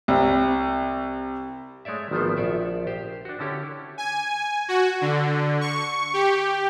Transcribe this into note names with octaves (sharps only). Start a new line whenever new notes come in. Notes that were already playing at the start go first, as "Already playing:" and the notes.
C2
G#3 A3 C#5 D5 E5
G#1 D#3 F3 A3 B3 C5
A#1 A4 D5 E5
G4 C5
D4 F#4
D3 C#4 E4 G4 A4
G#5
F#4
D3
C#6
G4